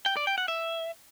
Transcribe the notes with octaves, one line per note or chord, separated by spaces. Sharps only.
G5
D5
G5
F#5
E5